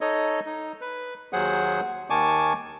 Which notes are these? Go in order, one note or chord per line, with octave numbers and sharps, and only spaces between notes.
D#4 A4 C#5 D#5
D#4
B4
D#2 F#3 G#4 C5 F#5
D#2 D#3 G#5 A5 C#6 D6